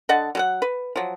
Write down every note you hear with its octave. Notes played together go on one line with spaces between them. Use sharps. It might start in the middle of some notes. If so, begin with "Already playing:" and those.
D3 D#5 F#5 A5
F#3 A4 F#5
B4
F3 F#3